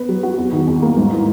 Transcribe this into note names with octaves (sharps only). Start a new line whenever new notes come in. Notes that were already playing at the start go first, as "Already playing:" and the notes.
Already playing: B3 B4
F#3
F#4
E2
D#3
E2
A#3
G#2
E3